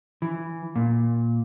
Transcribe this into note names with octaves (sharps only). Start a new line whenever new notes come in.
E3
A#2